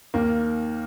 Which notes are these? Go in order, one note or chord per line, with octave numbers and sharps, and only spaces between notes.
D#2 A#3